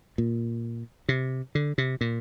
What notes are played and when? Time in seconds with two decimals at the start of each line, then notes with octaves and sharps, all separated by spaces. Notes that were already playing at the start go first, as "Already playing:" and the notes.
0.18 A#2
1.09 C3
1.55 D3
1.78 C3
2.01 A#2